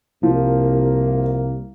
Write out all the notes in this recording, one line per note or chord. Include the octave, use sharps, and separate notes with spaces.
C2 F3 A#3